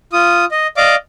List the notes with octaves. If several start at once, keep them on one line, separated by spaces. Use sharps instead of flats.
F4 D#6
D#5
D5 D#5 F5 D6